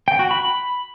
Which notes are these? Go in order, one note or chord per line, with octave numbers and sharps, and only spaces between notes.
G5
F#4
B5